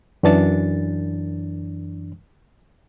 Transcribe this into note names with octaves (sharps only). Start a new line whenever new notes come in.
F#2 E3 D4 A6